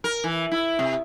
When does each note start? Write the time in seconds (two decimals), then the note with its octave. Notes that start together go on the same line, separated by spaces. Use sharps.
0.04 A#4
0.24 E3
0.52 E4
0.79 C3